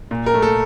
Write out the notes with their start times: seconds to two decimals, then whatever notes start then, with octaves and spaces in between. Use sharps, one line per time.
0.11 A#2
0.26 A#4
0.34 A3
0.42 A4